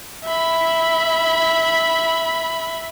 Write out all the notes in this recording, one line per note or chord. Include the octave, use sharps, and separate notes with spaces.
E5 B5